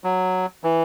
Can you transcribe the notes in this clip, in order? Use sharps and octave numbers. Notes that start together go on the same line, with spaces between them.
F#3
E3